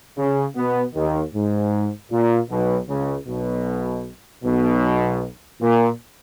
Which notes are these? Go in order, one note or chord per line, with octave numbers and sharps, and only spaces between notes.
C#3 C#4
B2 B3
D#2 D#3
G#2
A#2
B1 B2
C#2 C#3
B1 B2
B1 B2
A#2